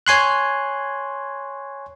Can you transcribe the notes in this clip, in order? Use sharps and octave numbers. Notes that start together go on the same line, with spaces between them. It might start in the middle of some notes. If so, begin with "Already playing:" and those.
C#5 G#5 C6 F#6